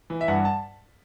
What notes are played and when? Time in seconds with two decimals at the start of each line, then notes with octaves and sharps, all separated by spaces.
0.10 E3
0.21 E5
0.28 G2 F#5
0.45 A5